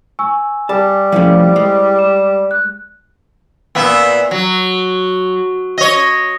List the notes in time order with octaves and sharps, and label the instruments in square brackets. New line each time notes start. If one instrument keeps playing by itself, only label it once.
[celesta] G#5 C#6 E6
[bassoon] G3 [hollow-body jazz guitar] A5
[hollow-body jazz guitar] F3 A3 C#4 [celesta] E4 C5
[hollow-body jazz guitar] G#3
[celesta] D6 E7
F#6
[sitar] A#2 B3 E5
F#3
C#5 D#5